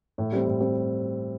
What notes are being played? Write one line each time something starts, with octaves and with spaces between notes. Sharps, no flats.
A2
G3 C4
A2
G3 C4